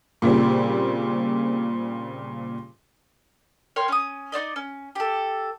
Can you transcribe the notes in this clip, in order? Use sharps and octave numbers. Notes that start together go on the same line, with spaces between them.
A#2 C#3 G3 C4
A#4 C#5 G5 C6
C#4 D#6
D#4 F#4 D5 D#5
C#4
G4 A4